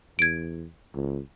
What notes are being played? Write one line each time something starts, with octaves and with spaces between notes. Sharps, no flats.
E2 G#6 D7
C#2